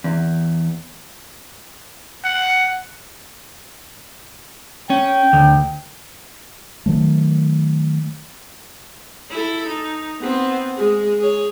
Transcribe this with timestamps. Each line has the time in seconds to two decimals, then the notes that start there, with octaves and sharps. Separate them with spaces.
0.04 E2
2.24 F#5
4.90 C#4 G5
5.33 D2
6.86 D#3 F#3 A3
9.30 E4 A4
9.68 D#4
10.21 B3 C4
10.75 G#3 G#4
11.19 G#4 C#5